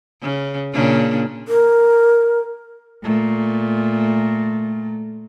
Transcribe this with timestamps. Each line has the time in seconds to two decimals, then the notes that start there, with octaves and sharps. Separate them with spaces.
0.22 C#3
0.73 A#2 C#3 D4
1.48 A#4
3.04 A#2 A3